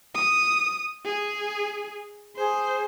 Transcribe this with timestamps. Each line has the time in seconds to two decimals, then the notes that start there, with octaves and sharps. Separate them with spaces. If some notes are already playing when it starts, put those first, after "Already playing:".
0.15 D#6
1.06 G#4
2.36 G#4 C5